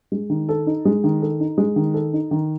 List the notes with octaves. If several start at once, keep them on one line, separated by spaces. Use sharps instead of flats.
G#3
D#3
A4
D#4
G#3
D#3
A4
D#4
G#3
D#3
A4
D#4
D#3